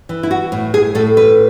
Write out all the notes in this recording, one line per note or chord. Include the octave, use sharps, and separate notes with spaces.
E3
E4
F#4
A2
G#4
A2 A4
B4